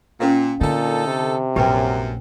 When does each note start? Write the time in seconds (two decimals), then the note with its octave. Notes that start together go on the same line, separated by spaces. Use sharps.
0.20 A#2 C#4 A#4 F5
0.61 A#2 D3 D#4 A4
1.07 C3
1.56 A#1 F#2 G4 B4 G5